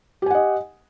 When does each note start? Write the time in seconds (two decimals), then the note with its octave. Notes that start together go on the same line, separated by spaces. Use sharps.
0.22 G4
0.26 G#5
0.30 F#5
0.35 D#5